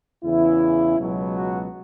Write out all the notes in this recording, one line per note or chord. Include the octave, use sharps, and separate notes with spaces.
E2 C#3 E3 E4
C#2 B2 F#3
F#4